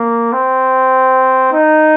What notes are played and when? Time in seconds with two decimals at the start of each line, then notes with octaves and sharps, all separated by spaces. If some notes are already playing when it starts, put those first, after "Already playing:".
Already playing: A#3
0.33 C4
1.52 D#4